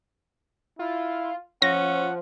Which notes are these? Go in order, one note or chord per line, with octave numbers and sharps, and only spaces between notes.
E4 F4
F3 C#4 F#5 A#6